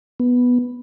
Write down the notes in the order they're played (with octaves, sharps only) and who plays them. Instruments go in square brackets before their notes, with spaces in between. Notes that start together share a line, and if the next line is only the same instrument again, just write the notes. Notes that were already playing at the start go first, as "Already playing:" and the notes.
[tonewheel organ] B3